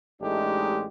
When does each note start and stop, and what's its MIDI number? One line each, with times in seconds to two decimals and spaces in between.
0.21 0.86 33
0.21 0.86 56
0.21 0.86 57
0.21 0.86 62
0.21 0.86 63
0.21 0.86 67